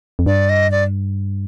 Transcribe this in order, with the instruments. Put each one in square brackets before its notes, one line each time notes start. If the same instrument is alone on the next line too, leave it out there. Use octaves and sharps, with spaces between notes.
[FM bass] F2
[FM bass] G2 [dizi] D5
[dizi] D#5
D5